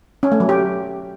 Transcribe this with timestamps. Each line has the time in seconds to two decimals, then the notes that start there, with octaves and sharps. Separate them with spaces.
0.23 C#4
0.32 A3
0.40 F#3
0.49 G4